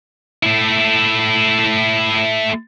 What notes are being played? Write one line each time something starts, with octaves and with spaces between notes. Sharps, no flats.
A3 E4